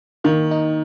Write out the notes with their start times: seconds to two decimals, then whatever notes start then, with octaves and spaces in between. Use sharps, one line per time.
0.24 D#3 A#3
0.51 D#4